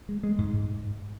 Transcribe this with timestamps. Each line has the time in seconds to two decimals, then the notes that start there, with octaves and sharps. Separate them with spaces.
0.09 G#3
0.23 G#3
0.38 G#2
0.53 G#2